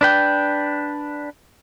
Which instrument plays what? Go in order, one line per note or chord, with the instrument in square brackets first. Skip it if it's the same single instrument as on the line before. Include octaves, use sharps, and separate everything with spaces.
[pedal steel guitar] D4 B4 G5